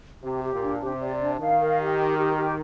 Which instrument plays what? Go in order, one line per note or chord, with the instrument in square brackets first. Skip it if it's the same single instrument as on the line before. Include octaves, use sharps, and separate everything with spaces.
[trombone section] C3 [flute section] G4
[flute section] G4
[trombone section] A#2
[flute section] D4
[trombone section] C3 [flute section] G4
[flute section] D5
D4
[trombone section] D#3 [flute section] F5
[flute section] A#4
G4
A#4
G4
G4